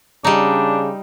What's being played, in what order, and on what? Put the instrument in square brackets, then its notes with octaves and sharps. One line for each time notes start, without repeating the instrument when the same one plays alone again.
[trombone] C#3 [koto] G3 D#4 [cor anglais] D4